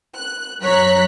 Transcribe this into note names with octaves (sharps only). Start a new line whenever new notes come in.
F#6
F#2 F#3 C#5 A#5 F#6 B6